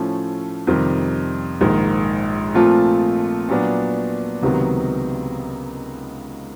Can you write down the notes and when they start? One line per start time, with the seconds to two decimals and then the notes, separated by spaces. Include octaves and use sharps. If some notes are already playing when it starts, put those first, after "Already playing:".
Already playing: A2 F3 A3 C#4
0.67 F2 C3 D#3 G3
1.61 A#1 G#2 D#3
2.54 A#2 F3 A3 C4 F4
3.49 A#2 F#3 B3 D4
4.42 C#2 C3 D#3 F#3 B3